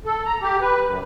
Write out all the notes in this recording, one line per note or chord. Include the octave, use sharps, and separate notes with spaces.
A4
A#5
G4
B4
F#2